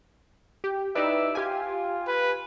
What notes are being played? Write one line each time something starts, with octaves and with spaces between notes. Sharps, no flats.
G4
D#4 E4 G4 B4 D5 E5
F4 G4 G#5
B4